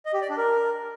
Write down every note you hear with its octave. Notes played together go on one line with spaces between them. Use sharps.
D#5
G4
D5
D4
A#4